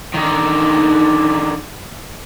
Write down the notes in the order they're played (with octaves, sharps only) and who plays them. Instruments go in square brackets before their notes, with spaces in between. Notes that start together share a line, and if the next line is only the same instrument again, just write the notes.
[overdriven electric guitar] D3 D#3